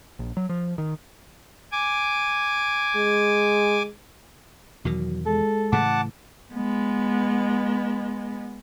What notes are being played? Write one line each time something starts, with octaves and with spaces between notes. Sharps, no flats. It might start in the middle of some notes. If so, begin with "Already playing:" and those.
A#1
F#3
F3
D#3
G#5 D6
G#3
E2 B2 D#3 F#3
G#3 A4
A2 C#3 E3 F#5 A5 D6
G#3 B3